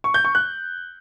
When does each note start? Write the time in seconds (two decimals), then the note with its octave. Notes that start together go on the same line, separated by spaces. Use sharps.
0.04 C#6
0.14 G6
0.25 C#6
0.35 F#6